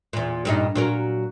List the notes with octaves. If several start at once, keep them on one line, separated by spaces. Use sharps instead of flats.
E2 A#2
G2 A#2 D#4
A#2 F#3 A#4